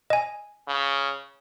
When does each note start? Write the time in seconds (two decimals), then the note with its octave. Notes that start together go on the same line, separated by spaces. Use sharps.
0.10 D#5 G#5
0.68 C#3